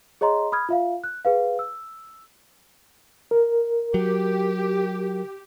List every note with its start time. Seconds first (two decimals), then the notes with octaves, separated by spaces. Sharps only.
0.21 G#4 C#5 D#5 A#5 C6
0.52 B5 D#6 F6 G#6
0.69 F4 E5 F5
1.04 F#6
1.25 G#4 B4 F5
1.59 E6
3.31 A#4
3.94 F#3 G4